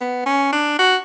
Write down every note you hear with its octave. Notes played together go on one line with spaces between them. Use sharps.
B3
C#4
D4
F#4